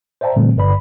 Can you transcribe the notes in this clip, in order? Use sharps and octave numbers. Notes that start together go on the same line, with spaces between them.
C5 D5 E5 G5 A5 A#5
A#2 D3 E3 G3 A3 C4
G1 G2 D3 B4 D5 B5